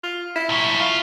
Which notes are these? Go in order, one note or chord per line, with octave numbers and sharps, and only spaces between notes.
F4
E4
B1 A2
F4